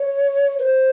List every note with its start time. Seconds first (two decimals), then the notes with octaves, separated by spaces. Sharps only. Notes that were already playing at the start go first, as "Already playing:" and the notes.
Already playing: C#5
0.59 B4
0.62 C5